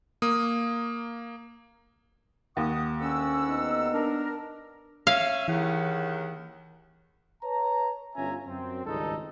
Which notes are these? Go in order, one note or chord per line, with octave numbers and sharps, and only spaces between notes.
A#3 D#6
D#2 F#5 C#6 D#6
D2 C#4 F#5 E6
B3 D#4
D4 A#4
C#4 E5 F5
D#2 C#3 E3 F#5
B4 C#5 A5 A#5
G1 C#4 F4 E5 G#5 A#5
F#2 C4
G#1 C#2 G2 G#3 D#4 A4